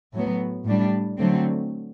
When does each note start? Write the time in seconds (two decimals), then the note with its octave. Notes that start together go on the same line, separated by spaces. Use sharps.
0.14 A2 F#3 B3
0.66 A2 G3 D4
1.18 D3 F#3 A3 C4